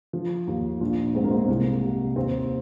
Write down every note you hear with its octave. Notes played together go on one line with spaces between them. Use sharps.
F3
D#2
A#1 F4
G#2 C4
A#3
C4
C2 A#3
C3
D#2 C4